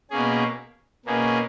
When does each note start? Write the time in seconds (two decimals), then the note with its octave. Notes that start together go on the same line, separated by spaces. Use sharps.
0.10 B2 A#3 C#4 G#4
1.05 B2 A#3 C#4 G#4